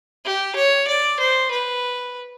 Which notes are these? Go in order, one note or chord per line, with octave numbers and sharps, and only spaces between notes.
G4
C#5
D5
C5
B4